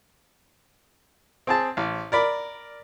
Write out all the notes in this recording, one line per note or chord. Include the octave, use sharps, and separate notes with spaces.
C4 G#4 A5
A1
A#4 D5 B5